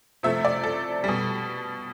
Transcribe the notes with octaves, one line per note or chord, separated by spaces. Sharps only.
C3 F3 A3 E5
D5
A4
B2 G3